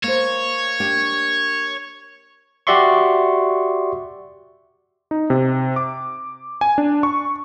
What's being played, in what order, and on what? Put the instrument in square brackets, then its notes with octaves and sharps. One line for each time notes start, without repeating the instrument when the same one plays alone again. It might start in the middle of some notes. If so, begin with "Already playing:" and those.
[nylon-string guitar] A#3 C5 [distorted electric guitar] C#5
[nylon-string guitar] A#3 D4 G4
[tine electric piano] F#4 G4 D5 E5 C6 C#6
[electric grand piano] D#4
C3
D6
G#5
D4
C#6